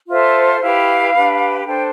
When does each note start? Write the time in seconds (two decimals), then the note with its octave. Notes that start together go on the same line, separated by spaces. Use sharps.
0.08 F4 A4 C5 E5
0.61 E4 G4 B4 F5
1.14 D4 G4 B4
1.66 D4 A4 C5 G5